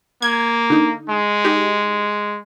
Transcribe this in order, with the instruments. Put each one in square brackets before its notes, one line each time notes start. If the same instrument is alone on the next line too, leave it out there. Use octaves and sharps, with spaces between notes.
[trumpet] A#3 [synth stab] G#6
[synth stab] D3 D#4
[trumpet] G#3
[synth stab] D#4 G4